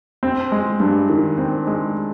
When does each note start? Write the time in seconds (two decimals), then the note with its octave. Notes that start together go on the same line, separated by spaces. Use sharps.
0.23 C4
0.52 G#3
0.80 G2
1.10 D#3
1.38 C4
1.67 G#3